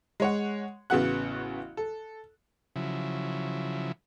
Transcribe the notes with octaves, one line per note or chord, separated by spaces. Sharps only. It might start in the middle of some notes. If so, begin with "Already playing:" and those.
G#3 C#5 F#5
A1 C#3 B3 F#4 F#5 F#6
A4
C#3 F3 F#3 E4